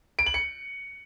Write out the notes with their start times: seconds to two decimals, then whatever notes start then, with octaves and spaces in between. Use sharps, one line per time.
0.19 D7
0.26 F#7
0.34 C#7